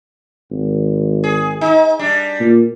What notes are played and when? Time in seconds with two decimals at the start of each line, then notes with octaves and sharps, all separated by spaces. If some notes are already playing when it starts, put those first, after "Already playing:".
0.51 G#1
1.24 G#4
1.61 D#4
1.99 G3 D4
2.40 A#2